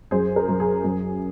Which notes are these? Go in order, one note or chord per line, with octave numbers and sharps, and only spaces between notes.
F#2 G#4 C5
A#4
F#2
G#4
F#2